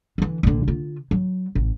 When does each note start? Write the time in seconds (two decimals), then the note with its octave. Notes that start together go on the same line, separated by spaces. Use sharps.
0.18 D3 E3
0.43 A#1 D3
0.68 D3 F4
1.11 F#3
1.55 A1